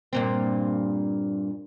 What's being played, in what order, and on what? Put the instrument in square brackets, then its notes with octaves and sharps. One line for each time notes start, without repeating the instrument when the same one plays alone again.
[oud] G2 A#2 C4